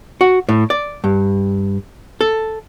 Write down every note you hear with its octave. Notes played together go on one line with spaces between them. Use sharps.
F#4
A2
D5
G2
A4